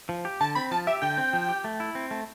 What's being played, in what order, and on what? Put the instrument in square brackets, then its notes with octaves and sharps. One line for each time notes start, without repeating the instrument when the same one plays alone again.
[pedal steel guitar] F3
G4
[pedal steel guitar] D3 [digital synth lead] A5
[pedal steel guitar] C4 [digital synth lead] B5
[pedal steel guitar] F3 [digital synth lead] A5
[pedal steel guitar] G4 [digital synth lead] E5
[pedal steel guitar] D3 [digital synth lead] G5
[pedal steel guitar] C4
F3
G4
A3
E4
C4
A3